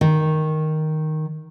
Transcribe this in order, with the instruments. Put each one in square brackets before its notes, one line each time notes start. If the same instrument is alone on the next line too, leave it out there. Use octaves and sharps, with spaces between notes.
[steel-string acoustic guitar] D#3